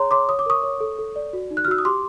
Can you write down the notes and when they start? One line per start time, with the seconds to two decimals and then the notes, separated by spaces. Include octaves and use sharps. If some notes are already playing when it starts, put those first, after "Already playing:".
Already playing: G#4 C#5 A#5 C6
0.11 C#5 C6 D6
0.29 C#5 D#6
0.39 D6
0.46 A#4 C#6 D#6
0.63 C#5
0.81 A4
0.99 A4
1.16 D5
1.33 F#4
1.51 D#4
1.57 F#6
1.65 F6
1.68 F#4 E6
1.78 D#6
1.85 G4 C6 D6